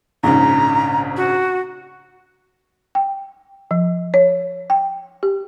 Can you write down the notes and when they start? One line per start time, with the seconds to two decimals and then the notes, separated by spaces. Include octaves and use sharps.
0.23 A#1 G#2 C#3 A#5
1.17 F#4
2.95 G5
3.71 F3
4.14 C#5
4.70 G5
5.23 G4